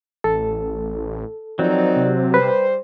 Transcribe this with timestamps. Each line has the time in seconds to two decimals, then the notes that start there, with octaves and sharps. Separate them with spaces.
0.24 A1 A4
0.57 A1
1.59 D#3 F3 F#3 C4 D#4 D5
1.96 C3
2.34 G3 B4 C5